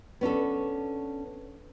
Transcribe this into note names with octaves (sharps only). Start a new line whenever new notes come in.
B3 C#4 D4 A4